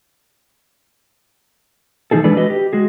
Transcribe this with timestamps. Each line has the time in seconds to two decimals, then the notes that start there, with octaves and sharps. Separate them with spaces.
2.11 E3 F#3 D#4 G#4 A4
2.24 E3 G#3 D4 A4 B4 D5
2.37 F#4 B4 D#5
2.50 G4
2.73 G#3 F#4 G#4